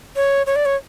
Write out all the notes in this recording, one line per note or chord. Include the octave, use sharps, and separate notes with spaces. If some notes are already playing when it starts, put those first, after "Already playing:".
C#5
C#5
D5
C#5